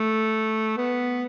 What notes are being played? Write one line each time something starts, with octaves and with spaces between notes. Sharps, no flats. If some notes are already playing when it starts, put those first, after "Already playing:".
Already playing: A3
B3